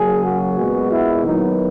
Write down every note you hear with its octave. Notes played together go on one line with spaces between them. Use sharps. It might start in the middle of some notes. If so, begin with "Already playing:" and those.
Already playing: C#3 F#3 A#3 G#4
F#4
A#2 G#3 B3
E4
D#3 F#3 B3 D#4